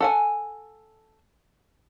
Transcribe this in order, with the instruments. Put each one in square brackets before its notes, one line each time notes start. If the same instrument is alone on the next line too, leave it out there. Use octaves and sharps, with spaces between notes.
[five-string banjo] A4 F#5 G#5